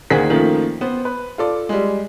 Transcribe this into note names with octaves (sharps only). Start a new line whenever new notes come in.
D2 D#3 A#3 C4 G#4 B6
F#2 D#3 F3 A3 A#3
B3 C4 C5
B4
F4 A4 D5
G3 G#3